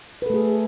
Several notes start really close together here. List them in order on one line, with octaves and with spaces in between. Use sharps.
B4 A4 A3 G#4